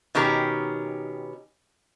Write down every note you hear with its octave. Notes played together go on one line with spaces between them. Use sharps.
B2 D#3 C#4 G4 A#4